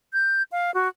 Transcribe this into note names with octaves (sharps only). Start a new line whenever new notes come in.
G6
F5
F#4